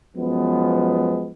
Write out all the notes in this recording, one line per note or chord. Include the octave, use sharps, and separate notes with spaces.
F#2 F3 G#3 B3